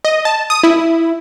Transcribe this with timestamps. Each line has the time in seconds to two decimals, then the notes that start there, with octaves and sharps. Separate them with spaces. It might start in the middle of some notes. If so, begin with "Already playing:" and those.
0.05 D#5
0.25 A5
0.50 D#6
0.64 E4